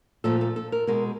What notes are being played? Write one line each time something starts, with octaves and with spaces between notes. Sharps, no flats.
A#2 F3 A3 A4
A4
A4
A#4
B2 G#3 A#4